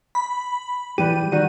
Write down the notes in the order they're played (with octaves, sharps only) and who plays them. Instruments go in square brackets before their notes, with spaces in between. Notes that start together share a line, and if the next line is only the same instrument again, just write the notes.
[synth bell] B5
[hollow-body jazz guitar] E3 G3 G4 [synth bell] D#7
[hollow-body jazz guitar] D#3 G3 F#4